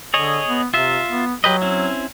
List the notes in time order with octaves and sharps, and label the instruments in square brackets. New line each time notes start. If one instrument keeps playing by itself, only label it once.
[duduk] D3 [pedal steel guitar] G#4 C#5 D#5
[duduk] B3
[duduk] C3 [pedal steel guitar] F4 E5
[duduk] B3
[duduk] F#3 [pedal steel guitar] G4 B4 D#5
[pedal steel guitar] C4 C#4 E4